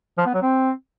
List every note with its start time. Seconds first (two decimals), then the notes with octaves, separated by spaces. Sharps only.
0.18 F3
0.26 B3
0.34 F#3
0.42 C4